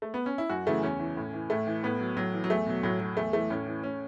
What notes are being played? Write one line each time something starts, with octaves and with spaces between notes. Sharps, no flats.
A3
B3
C#4
E4
F#2 F#4
C#3 E3 A3
E2 C#4
E3
A2
E3
A2 A3
E3
A2 B3
F#3
A2 F#3
E3
F#3
E2 A3
B2 F#3
A2 F#3
F#3
E2 A3
E3 A3
A2 C#4
E3
A2 C#4